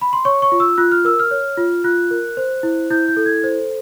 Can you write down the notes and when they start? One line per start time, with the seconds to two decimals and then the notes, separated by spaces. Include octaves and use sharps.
0.01 B5
0.13 C6
0.25 C#5 C#6
0.42 C#6
0.52 F4
0.60 E6
0.77 F4 F#6
0.92 F6
1.05 A#4 E6
1.20 F6
1.31 C#5
1.57 F4
1.84 F4 F#6
2.11 A#4
2.37 C5
2.63 E4
2.90 E4 G6
3.08 G6
3.17 A4
3.26 G#6
3.44 C5